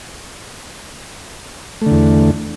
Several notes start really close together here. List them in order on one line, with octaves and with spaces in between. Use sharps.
A3 D3 E2